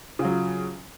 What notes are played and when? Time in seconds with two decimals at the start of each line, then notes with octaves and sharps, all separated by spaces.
0.19 C#3
0.22 F4
0.25 F#3